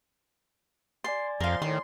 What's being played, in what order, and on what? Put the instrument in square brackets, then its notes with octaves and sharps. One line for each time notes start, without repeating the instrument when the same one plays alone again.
[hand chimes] D5 G#5 A6 [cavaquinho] C6
[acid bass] F2 [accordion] F3 C6 [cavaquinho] A#4 F5
[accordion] A2 [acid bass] D#3 [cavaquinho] C6